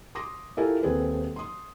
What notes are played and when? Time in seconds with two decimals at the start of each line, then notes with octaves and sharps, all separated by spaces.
0.15 C6 D6 D#6 A#6
0.57 E4 F4 G4 A4 A#4 G#5
0.83 D#1 C4 G#4 A4 B4
1.36 C6 D#6